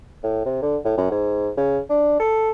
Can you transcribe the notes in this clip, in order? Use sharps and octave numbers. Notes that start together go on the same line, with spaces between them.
A2
C3
D3
A2
F#2
G#2
C#3
D4
A4